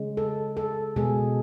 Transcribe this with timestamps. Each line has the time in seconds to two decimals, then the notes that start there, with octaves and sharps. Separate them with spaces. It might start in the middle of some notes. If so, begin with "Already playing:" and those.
Already playing: C#3 G#3
0.17 A4
0.57 A4
0.96 B2 G#3 G#4